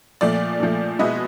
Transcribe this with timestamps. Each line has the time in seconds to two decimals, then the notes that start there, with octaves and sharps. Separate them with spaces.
0.21 A#2 F3 A3 D5
0.60 A#2 F3 A3
0.99 B2 G#3 B3 E4 D#5